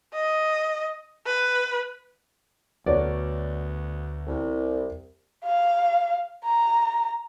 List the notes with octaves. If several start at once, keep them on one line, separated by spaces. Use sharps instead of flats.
D#5
B4
D2 B3 F#4 A#4 C#5 D5
C2
F5
A#5